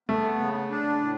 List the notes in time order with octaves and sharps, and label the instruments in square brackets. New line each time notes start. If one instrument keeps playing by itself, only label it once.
[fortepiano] A3 [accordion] B3
[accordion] C#3
D4
A2